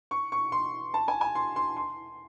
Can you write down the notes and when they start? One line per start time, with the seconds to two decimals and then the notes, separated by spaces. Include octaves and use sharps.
0.11 C#6
0.32 C#6
0.52 C6
0.94 A5
1.08 G#5
1.21 G#5
1.35 C6
1.56 C6
1.77 C6